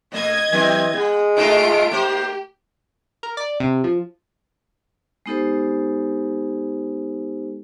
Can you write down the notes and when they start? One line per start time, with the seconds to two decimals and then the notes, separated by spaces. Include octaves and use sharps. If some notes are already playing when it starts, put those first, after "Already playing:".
0.12 B2 A3 D#5 G#6
0.52 E3 F#3 C4 G4
0.93 G#3 B3
1.37 A3 D#4 F4 F#4 A4 D7
1.91 A#3 G4 C5
3.23 A#4
3.37 D5
3.60 C3
3.84 F3
5.26 G#3 B3 D#4 G4 A4 C5